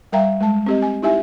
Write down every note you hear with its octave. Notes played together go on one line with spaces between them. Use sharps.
G3 A#4 E5 F5 G5 A#5
G#3 A5
C4 G4 D#5
G#5
D#4 E4 G4 E5 G#5